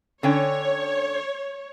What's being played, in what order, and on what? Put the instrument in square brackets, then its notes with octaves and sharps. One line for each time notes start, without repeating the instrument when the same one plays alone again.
[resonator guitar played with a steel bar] D3 C#4 G5 [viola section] C#5